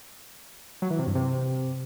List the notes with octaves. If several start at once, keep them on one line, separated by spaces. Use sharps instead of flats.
F#3
E3
C3
G2
C3